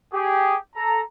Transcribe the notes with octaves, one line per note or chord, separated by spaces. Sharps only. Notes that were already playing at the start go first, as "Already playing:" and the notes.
G4 G#4
A4 A#5